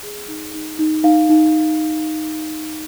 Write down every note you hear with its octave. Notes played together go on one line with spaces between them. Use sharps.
G#4
D#4
D#4
D#4
D#4 F5
D#4